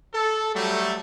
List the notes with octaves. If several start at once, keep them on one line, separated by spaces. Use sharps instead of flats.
A4
F#3 G3 A3